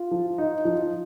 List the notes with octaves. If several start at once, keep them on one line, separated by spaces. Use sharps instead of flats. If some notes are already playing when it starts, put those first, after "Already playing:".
Already playing: F4
F3
D#4
F3